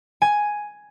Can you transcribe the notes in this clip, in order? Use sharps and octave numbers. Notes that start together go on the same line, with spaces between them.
G#5